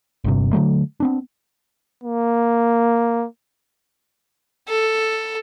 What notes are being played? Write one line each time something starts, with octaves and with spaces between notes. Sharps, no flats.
G1 G2 C3
D3 E3 F#3 A3
B3 C4 D4
A#3
A4